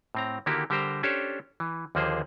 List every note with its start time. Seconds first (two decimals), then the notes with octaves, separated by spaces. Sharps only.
0.15 A2 C4 A#5
0.46 D3 D#3 A#3 E4 F#4 G4
0.70 D3 G3 G4 A#4 C5 A#5
1.03 C#4 D4 G4 A4 C5 C#5
1.60 E3
1.95 D#2 D3 F3 A#3 G#4 C5